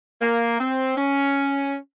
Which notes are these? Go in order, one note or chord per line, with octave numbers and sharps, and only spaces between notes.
A#3
C4
C#4